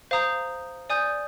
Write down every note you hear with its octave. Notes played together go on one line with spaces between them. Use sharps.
C5 F5 A#5 D#6 G6
D5 G#5 D#6 G6